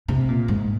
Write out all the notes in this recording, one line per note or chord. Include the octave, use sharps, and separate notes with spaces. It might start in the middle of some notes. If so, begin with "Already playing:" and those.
C3
A#2
G#2